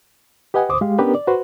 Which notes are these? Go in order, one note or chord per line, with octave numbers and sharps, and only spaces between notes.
G4 B4 D#5 F#5 G#5
D2 C5 D6 D#6
G#3 G4 F5
B3 C#4 D4 G4 A#4 B4
D5
F#4 B4 C5